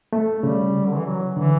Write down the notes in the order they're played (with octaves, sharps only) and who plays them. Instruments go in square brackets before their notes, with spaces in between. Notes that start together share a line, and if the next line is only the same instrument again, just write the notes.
[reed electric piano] A3
[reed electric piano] C#3 [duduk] G3
[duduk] D3
E3
F#3
[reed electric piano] D3 [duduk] E3